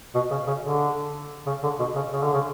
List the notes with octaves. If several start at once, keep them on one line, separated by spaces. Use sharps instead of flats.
B2
C#3
C#3
D3
C#3
D3
B2
C#3
C#3
D3
C#3